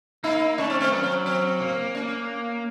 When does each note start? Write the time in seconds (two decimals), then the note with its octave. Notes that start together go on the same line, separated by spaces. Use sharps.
0.24 A#3 D#4
0.58 A3 C#4
0.70 C4
0.81 C4
0.92 F#3 A#3
1.03 C4
1.26 C4
1.60 A#3
1.95 C#4